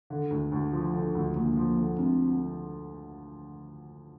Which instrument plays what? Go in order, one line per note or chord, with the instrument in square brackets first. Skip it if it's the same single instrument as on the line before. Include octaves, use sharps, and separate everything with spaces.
[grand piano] D3
D2
D2
F3
D3
D2
[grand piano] D2 [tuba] A#3
[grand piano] F3
D3
[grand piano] D2 [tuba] C4